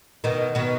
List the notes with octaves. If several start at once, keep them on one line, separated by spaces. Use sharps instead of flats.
B2 D#3
B2 D#3